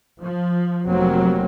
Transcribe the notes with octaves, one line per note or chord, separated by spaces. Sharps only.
F3
F1 F2 F#3 A#3 C4